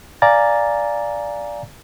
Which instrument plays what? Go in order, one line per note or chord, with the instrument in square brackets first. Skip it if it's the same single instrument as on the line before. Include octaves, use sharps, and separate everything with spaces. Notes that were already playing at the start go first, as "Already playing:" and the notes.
[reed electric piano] D5 F5 G#5 A#5 A6